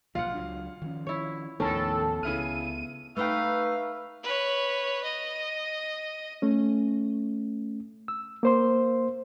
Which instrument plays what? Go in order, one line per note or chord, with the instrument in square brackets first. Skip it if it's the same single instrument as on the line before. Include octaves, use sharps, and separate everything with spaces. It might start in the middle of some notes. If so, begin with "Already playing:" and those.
[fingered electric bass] B1 A#2 F3 [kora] F4 F#5 [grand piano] F5
[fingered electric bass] C#2 F#3 D4
D#3 F3 C#4
[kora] E4 C#5
[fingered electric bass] D#2 F3 B3 [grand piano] A2 D#3 [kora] C#4 [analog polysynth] A4
[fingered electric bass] C#2 B3 [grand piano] C#3 E4 F6 [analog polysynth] D#7
[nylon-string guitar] A3 D#4 G5 [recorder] B4 [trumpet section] E5 C#6 [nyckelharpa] F5
[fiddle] B4 C#5
D#5
[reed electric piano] A3 C#4
E6
A#3 C5 C6